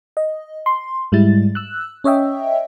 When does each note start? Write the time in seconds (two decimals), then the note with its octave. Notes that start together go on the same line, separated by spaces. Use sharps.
0.17 D#5
0.66 C6
1.12 G#2 G3 G#3 E4 A6
1.55 E6 F#6
2.04 C#4 C#5 D#5 E5 G5